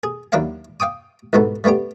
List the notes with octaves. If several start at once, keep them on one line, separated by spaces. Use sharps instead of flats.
G#4
D#2 F#3 D4 E4 F5 F#5
F5 G5 D6 D#6
C2 G#2 B2 B3 A4
G3 A3 B3 D4 G4